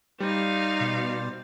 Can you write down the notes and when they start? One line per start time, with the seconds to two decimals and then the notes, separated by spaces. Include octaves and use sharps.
0.20 G3 D#4 C5 D5 F5
0.80 B2